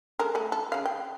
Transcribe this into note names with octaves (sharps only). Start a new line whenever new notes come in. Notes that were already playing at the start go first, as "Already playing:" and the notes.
G#3 A4 A#4
A3 A4
A4
C#3 F5
G5